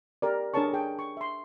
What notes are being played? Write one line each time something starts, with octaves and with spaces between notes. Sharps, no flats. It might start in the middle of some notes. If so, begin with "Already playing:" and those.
G4 A#4 D5
D4 G#4 A#4 C#5 A5 C#6
G#4 G5
C#6
E5 C6